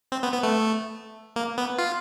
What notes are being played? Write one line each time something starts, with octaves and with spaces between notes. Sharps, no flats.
C4
B3
B3
A3
A#3
B3
F4